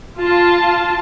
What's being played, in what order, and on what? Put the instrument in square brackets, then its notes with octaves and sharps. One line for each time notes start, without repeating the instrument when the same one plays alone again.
[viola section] F4 A5